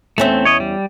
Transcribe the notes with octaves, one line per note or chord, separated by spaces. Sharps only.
E2 A3 C4 C#4 E5
C#5 D#5
G3